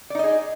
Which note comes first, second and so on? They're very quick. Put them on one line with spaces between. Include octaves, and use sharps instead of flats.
D5 D#4 D#5 G#4